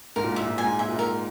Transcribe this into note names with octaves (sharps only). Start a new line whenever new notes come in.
G#2 A#4
A#2
G#2
A#2 E5
G#2
A#2 G#5
G#2
A#2
G#2 E5
A#2
G#2 A#4